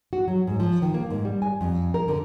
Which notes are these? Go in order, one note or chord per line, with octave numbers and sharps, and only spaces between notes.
F#4
F#3
G#2
F3
D#3
A#3
G#2
G3
G#5
F2
A#4
D3